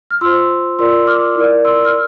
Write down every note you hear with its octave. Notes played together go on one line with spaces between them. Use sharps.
F6
F4 C5 C6 E6
F4 A#4 D5 C6 E6
D6 F6
E4 A#4 D5
C6 E6
F6